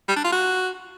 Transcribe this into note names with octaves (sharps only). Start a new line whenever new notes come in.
G3
D4
F4
F#4